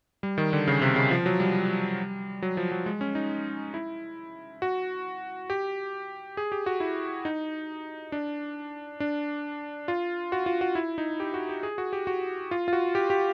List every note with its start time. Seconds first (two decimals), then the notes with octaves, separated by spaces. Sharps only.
0.23 G3
0.38 D#3
0.53 D3
0.68 C#3
0.82 C3
0.96 C#3
1.11 F3
1.26 F#3
1.40 G3
2.42 F#3
2.57 F3
2.72 F#3
2.86 G#3
3.01 C#4
3.15 D#4
3.74 E4
4.62 F#4
5.50 G4
6.37 G#4
6.52 G4
6.66 F#4
6.80 E4
7.25 D#4
8.12 D4
9.00 D4
9.88 F4
10.32 F#4
10.46 F4
10.61 F#4
10.75 E4
10.98 D#4
11.20 G4
11.34 F#4
11.49 G4
11.63 G#4
11.78 F#4
11.93 G4
12.07 F#4
12.51 F4
12.68 F4
12.73 F#4
12.95 G4
13.10 G4